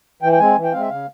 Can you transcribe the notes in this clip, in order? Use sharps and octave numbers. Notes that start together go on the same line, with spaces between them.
E3 G5
G5
G#3 C4 G#5
E3
G5
G#3 C4 F5
E5
C#3 F5